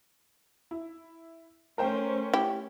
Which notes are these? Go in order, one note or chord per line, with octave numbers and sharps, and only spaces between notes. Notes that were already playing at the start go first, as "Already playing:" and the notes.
E4
A3 C#4 A#4 C5 G5
E4 G4